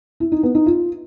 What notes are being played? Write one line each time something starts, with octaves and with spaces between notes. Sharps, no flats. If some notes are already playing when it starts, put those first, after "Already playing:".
E4
D#4
B3
D#4
F4